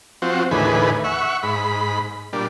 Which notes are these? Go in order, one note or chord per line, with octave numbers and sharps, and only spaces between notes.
F3 C4 F#4
D#2 A2 D3 E3 G#4 B4
E5 F#5 C#6
G#2 B5
A#2 G3 D4